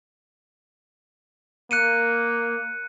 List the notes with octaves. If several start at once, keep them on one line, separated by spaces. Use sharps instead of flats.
A#3 F#6 C#7 D#7